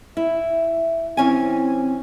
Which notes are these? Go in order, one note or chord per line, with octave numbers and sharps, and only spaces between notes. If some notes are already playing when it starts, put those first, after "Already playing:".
E4 E5
E3 C4 C#4 G#5